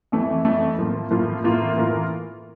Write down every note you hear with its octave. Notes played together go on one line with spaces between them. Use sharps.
F2 E3 A3
F2 E3 A3
A2 F3 A#3 F4
A2 F3 A#3 F4
A2 E3 A#3 F4 A#4
A2 E3 A#3 F4 A#4